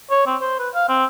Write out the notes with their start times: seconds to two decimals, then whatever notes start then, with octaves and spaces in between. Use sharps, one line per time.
0.10 C#5
0.27 C4
0.41 C5
0.59 B4
0.74 F5
0.89 C4